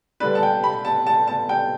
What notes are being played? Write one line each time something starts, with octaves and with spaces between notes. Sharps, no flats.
D3 G3 D4 B4
A5
G5
B5
A5
A5
A5
G5